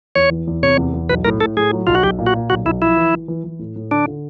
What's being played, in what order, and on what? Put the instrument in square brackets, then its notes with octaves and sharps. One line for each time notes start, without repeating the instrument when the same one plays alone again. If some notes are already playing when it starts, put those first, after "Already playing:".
[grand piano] E2 [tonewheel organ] C#5
[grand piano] E3
E2
[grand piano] C3 [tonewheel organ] C#5
[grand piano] E2
E2
[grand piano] B1 [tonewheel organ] B4
[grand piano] A2 [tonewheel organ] A#4
[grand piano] A2 [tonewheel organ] A4
[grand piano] A2 [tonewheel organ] G#4
[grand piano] F#3
[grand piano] B1 [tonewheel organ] F4
[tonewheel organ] F#4
[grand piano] B1 [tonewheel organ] G4
[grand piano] A#2
[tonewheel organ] F#4
[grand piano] A#2
[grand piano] B1 [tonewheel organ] F#4
[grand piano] B1 [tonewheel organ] E4
[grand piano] F3 [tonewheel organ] E4
[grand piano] E3
E3
E3
E3
A2
A2
[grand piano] D3 [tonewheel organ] D4
[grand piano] D3